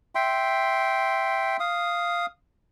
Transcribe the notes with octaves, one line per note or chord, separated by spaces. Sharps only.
E5 G5 C6
F5 D#6